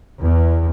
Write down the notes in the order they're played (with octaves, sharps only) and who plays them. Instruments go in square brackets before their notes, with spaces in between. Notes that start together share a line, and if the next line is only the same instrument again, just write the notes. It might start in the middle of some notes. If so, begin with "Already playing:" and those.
[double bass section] E2